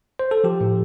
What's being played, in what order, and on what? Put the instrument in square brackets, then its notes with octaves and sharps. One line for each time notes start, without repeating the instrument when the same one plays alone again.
[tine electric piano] C5
A4
F3 G4
A2